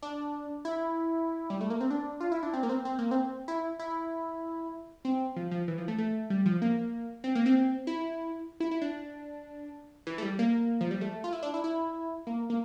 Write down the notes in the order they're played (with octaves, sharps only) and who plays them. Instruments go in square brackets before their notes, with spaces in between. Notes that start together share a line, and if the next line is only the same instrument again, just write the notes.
[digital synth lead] D4
E4
G3
A3
A#3
C4
D4
F4
E4
D4
C4
A#3
C4
C4
A#3
C4
E4
E4
C4
F3
F3
E3
F3
A3
A3
G3
F3
A#3
C4
A#3
C4
E4
E4
E4
D4
E3
A3
G3
A#3
F3
G3
A3
F4
E4
D4
E4
E4
A#3
A#3